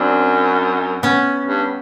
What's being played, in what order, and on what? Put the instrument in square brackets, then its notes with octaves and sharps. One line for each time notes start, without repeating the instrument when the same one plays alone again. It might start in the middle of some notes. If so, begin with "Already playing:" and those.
Already playing: [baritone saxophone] F#2 [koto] C4 D4
[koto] B3 C#4
[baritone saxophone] G2